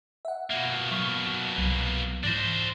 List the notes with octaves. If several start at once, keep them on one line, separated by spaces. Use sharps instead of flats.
E5 F#5
B2 A#3
F#3 C#6 B6
C2 F#3
G#2 E3 D4 C5 A#6